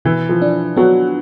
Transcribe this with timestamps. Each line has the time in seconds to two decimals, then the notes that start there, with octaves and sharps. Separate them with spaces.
0.05 B2 E3
0.29 F3
0.42 D4
0.76 F#3 B3